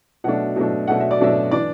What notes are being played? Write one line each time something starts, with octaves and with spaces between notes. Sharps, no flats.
B2 F#3 A3 D4 F#5
B2 F#3 A3 D4
B2 F#3 A3 D4 F#5
E5
D5
B2 F#3 A3 D4 E5
E3 D4 D5